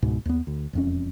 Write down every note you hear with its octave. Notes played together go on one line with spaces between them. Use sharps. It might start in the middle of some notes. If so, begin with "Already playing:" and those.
C#2 G#2 B2
D#2 B3
D2
E1 F2 C#4